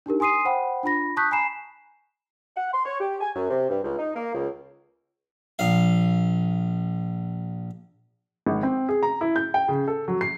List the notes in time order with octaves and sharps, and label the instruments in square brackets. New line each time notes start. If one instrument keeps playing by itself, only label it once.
[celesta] D4 D#4 G4 A#4
G#5 C6 D#6 C7 D#7
C5 F#5 G5 B5
D4 F4 B5 A#6
A5 C#6 D#6 F#6 G6 B6
G#5 A#5 B5 C7 E7
[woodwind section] F#5
C6
C#5
G4
G#5
F#2
C3
G2
C#2
D#4
A#3
C#2
[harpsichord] A#1 F5
[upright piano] G#1
C4
G#4
A#5
E4
G6
G5
C#3
A4
F#3
C7